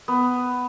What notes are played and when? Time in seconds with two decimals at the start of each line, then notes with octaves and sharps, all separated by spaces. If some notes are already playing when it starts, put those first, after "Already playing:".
0.08 B3